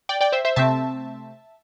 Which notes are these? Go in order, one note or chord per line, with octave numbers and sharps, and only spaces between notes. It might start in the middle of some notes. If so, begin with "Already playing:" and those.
D5 G5
D5 G5
C5 E5
C5 E5
C3 A3 C4 E5 A5